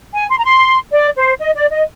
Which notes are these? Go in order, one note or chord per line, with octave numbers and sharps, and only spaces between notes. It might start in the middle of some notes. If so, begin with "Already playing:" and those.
G#5
C6
A#5
C6
D5
C5
D#5
D5
D#5